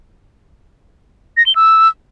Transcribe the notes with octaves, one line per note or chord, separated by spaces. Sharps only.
A#6
G7
E6